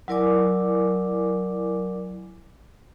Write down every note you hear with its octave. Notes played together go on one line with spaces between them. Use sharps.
F#3 E4 A#4 D5 G#5 D6